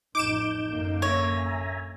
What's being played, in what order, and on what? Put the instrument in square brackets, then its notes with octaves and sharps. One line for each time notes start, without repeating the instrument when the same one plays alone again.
[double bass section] A1 F2 [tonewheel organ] D#4 G6 [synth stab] D6 D7 E7
[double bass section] F#2 D3 A#3
[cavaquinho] C#5 [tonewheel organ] E5 G#5 A#5